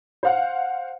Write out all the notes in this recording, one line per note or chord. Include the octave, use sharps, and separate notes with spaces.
C5 F5 F#5